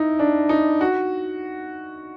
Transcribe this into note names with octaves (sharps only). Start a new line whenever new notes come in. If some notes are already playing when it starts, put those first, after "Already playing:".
Already playing: D#4 E4
D4
D#4
F#4